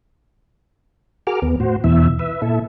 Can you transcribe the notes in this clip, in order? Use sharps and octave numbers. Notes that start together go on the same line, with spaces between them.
F#4 G#4 A#4 D6 F6
D#2 B3
A2 F#4 C5
E2 B2 E3 E5
B4 E5
A#2 E4 A4 E5